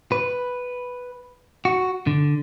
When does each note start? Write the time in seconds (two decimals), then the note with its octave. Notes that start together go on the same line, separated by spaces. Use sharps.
0.12 B4
1.65 F#4
2.07 D3